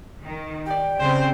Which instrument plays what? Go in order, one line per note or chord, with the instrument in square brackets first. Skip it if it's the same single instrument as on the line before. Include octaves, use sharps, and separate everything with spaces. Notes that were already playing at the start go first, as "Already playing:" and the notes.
[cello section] D#3
[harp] G4 D5 [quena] G5
[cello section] C#3 C4 [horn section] C5